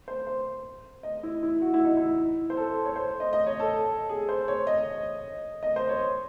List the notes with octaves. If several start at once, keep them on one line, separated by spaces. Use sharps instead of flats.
C5
C5
D#5
E4
E4
F#4
E4
D#4
E4
C5
A4
C#5
C5
D#5
D#5
C#5
A4
G#4
C5
C#5
D#5
D#5
C5
C#5